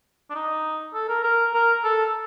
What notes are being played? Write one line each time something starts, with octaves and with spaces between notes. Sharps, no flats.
D4
D#4
A4
A#4
A#4
A#4
A4